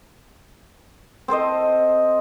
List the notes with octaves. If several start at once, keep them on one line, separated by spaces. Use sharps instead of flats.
C4 A4 C5 D#5